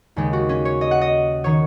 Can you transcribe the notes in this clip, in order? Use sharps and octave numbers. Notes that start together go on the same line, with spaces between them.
D#2 C#3 G#3
F#4
C#4
C#5
D#5
F#5
D#5
D#3 C#5